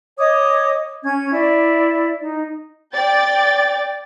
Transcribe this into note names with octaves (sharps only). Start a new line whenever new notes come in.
C#5 D#5 D6 D#6
C#4 G#6
E4 D5
D#4
D5 G5 A6